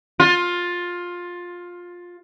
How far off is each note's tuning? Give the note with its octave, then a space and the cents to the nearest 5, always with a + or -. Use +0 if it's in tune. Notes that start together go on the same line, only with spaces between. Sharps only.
F4 +15